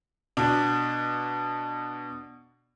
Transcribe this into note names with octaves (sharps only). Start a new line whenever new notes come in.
B2 D4